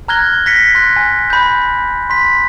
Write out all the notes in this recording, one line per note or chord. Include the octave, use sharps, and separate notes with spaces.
A#5 F6 F#6 G#6 A#6 G7
G#6 A#6 B6 C#7
C6 F#6
G#5
B5 G6
C6 B6